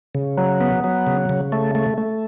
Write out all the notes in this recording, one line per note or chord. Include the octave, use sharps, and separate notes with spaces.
C#3
F#3
B3
F#3
C#3
C#3
A3
A3
A3